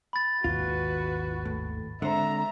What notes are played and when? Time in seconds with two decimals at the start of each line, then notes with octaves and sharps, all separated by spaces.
0.13 B5 A6
0.44 G#1 D#2 B2 F4 F#4 B4
1.45 A2
2.02 D3 G#3 C4 C5 E5 A#5